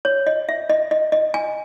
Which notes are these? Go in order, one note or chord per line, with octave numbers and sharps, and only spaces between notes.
C#5
D#5
E5
D#5
D#5
D#5
G#5